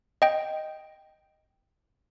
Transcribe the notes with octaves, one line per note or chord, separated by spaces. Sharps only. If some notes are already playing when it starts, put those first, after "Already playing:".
D#5 G5